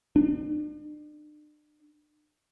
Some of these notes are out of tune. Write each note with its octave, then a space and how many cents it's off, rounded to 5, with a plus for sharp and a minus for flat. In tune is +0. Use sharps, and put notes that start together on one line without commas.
D4 +40